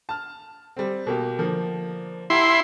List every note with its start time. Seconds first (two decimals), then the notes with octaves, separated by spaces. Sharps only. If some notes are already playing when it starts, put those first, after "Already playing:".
0.09 A5 F6
0.77 G3 C4
1.06 B2 A#3 G4
1.38 D3 F3 A#3
2.30 E4 G4 F#5 A#5 C6